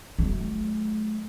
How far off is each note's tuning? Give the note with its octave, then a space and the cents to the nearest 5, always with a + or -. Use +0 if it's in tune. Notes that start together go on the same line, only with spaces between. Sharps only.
F#3 +0 A3 -40